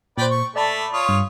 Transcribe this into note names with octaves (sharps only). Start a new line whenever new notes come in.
A#2 B4 C5 D5 G5
C#6
A3 D5 A5 B5
F4 C#5 D#6
G2